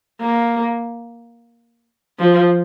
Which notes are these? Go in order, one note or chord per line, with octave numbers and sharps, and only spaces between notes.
A#3
F3